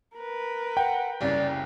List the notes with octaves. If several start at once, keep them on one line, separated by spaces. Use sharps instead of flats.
A#4 B4
F#5 G5
F#1 C2 C#3 D5